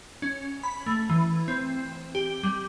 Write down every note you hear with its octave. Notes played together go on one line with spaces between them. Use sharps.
C#4
B5
A3
E3
C4
G4
G3